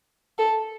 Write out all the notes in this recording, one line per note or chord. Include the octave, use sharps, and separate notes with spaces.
A4